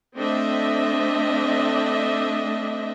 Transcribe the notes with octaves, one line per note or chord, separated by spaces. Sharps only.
A3 C4 D4 D#5 E5